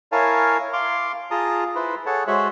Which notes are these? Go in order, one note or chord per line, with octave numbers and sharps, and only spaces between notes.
E4 A#4 C#5 F5 G#5 A5
F5 C6 D6
F4 G#4 A5 A#5 D#6
E4 B4 C5
G#4 A4 C#5 F#5 A5
G#3 F#4 C5 C#5 E5 F#6